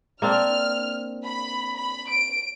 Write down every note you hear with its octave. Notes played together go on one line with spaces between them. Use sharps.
A#3 C4 D4 F6
B5
B5
D7